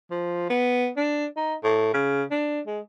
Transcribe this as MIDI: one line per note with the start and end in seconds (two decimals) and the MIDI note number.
0.11 0.49 53
0.50 0.89 59
0.97 1.26 62
1.36 1.55 63
1.64 1.91 45
1.94 2.24 49
2.31 2.60 62
2.67 2.80 56